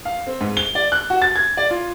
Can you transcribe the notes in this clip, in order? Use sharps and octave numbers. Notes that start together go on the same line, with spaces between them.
F5
C4
G#2
G7
D5
F#6
F#4
A6
G#6
D5
F4